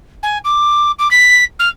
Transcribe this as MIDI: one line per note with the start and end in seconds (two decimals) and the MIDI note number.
0.23 0.38 80
0.45 0.92 86
0.99 1.10 86
1.11 1.44 95
1.59 1.69 89